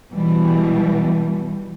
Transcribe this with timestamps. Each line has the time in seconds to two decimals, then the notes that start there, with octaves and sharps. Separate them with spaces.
0.12 B2 E3 G3